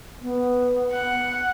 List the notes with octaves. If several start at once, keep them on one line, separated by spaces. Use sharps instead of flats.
B3
F#5